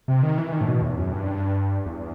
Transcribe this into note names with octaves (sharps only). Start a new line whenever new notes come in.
C3
D#3
E3
D#3
A2
B2
E2
F#2
G2
E2